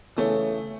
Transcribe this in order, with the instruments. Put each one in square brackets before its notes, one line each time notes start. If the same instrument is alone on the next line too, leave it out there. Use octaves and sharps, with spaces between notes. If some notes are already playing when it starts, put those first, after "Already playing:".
[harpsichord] C#3 E3 [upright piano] A3